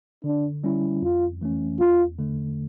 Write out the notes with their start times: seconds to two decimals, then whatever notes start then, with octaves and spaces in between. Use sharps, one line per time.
0.24 D3 D4
0.64 G3 C#4 E4
1.02 F2 F4
1.41 E3 A3 C#4
1.80 E2 F4
2.18 D3 A3